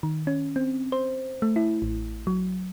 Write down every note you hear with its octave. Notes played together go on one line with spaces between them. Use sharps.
D#3
C#4
C4
C5
A3
E4
A1
F#3